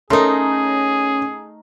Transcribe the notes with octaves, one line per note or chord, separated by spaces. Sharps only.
A3 C#4 D#4 G#4 A#4 C6